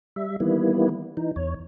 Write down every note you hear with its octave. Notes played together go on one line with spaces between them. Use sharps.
G3 E5
D#3 E3 G3 A#3 B3 E4
E3 D#4
E2 C#5